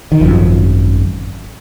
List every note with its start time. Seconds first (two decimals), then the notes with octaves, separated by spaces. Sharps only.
0.12 D#3
0.21 G#1 F#2 C#3 F3